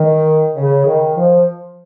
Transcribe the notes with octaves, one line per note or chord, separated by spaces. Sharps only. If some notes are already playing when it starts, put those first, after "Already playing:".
Already playing: D#3
C#3
D#3
F3